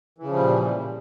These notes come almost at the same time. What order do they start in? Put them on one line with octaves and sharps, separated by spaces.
E3 C#3 F3 G3 A#2